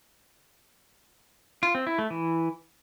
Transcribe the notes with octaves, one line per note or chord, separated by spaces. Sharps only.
F4
C4
E4
A3
E3